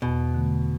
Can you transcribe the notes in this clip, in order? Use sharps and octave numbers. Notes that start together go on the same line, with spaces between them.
E2 B2
D3 A3